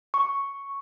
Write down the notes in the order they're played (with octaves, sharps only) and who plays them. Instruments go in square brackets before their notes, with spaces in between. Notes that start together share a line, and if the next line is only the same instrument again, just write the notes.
[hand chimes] C#6